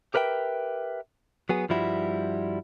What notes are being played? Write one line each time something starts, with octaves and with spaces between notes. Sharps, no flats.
G4 A#4 B4 E5 G5
F#3 B3 G#4
G2 F3 G3 E4 F#4